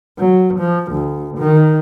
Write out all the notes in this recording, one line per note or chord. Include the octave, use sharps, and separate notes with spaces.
F#3
F3
D2
D#3